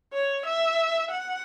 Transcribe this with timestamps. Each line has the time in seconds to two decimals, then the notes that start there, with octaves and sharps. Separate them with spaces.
0.13 C#5
0.45 E5
1.10 F#5